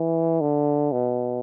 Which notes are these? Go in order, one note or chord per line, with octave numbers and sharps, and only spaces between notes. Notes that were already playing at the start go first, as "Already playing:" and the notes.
Already playing: E3
D3
B2